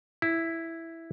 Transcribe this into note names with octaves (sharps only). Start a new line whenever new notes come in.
E4